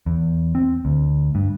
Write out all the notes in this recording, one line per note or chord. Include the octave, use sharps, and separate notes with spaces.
E2
C4
D2
G2